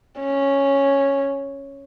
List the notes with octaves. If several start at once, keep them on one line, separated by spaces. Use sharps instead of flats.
C#4